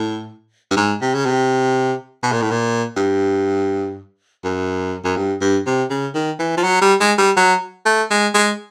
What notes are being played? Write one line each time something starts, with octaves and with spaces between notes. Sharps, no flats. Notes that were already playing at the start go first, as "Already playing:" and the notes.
Already playing: A2
G2
G#2
C3
C#3
C3
B2
A#2
A2
A#2
G2
F#2
F#2
G2
G2
C3
C#3
D#3
E3
F3
F#3
G3
G#3
G3
F#3
A3
G#3
G#3